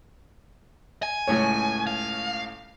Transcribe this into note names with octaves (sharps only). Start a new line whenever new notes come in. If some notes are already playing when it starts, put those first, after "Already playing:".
G#5
C#2 A2 C#5
F5